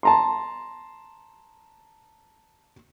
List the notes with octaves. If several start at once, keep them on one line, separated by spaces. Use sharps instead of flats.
A5 A#5 C6